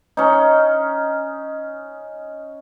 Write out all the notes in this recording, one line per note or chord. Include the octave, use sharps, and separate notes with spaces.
C#4 D#4